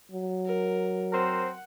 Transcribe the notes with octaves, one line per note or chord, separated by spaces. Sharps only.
F#3
A#4
C4 A#4 C5 F#5